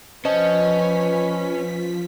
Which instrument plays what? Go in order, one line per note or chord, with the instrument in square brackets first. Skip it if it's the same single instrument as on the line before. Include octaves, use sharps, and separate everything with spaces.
[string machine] F3 B6 [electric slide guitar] C#4 [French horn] B4 [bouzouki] C5 D#5 A5